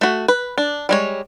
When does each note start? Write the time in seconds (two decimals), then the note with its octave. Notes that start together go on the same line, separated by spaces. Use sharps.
0.01 A3 F#4
0.28 B4
0.58 D4
0.89 G3 G#3 C#5